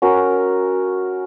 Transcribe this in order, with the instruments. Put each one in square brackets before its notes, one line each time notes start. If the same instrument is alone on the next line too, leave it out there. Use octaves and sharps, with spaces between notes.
[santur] C#4 F#4 A#4